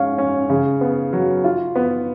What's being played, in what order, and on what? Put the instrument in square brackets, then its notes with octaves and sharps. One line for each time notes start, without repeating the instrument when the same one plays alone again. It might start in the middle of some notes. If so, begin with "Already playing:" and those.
Already playing: [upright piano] G#2 C#4 [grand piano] F5
[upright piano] C#4
C#3
B3
F#3
F4
B3